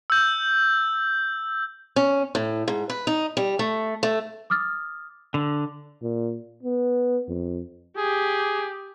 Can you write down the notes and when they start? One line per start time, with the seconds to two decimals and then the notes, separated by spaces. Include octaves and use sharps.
0.10 E6 G6
1.96 C#4
2.35 A2
2.68 G#2
2.90 B4
3.07 D#4
3.37 G3
3.59 A3
4.03 A3
4.50 D6 D#6 F6 A6
5.34 D3
6.02 A#2
6.63 B3
7.28 F2
7.97 G4 G#4